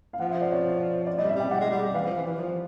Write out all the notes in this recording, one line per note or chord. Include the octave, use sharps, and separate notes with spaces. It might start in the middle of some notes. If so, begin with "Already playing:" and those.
F5
F3 F#5
E5
D5
C#5
D5
G3 D#5
E5
G3 G5
G3 F#5
G#3
G3
E3 F5
F3
E3
E3
F3